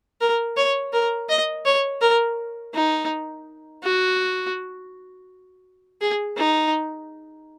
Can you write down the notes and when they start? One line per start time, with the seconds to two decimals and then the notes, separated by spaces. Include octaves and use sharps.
0.21 A#4
0.57 C#5
0.93 A#4
1.29 D#5
1.65 C#5
2.01 A#4
2.74 D#4
3.83 F#4
6.01 G#4
6.37 D#4